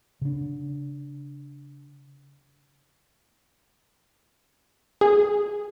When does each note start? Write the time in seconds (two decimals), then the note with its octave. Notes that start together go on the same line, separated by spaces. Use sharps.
0.21 C#3 D4
5.01 G#4